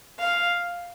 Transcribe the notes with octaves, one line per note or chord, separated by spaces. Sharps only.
F5